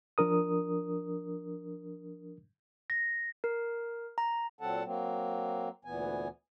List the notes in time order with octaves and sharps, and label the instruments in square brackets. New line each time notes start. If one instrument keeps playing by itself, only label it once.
[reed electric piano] F3 D4 A#4 D#6
[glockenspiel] A#6
[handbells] A#4
A#5
[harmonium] A#2 F#3 C4 A4 F#5 A5
F#3 A#3 C4
D2 A#2 E3 B3 G#5